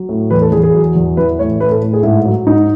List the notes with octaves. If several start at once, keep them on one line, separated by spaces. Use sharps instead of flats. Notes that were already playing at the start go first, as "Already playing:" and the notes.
Already playing: F#3
A2
E2 B4
A4
E2 G#4
G#4
F#3
E2
E3 B4
A2 C#5
A2 B4
A4
A2
G#4
G#2 E4
F#3
G#2 D#4